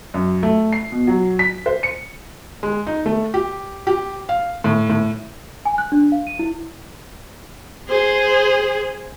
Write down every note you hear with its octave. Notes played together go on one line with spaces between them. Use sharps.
F#2
A3
C7
B2
F#3
B6
C5
C#7
G#3
D#4
A3
G4
G4
F5
A2
A2
G#5
F#6
D4
F5
D#7
E4
G#4 C5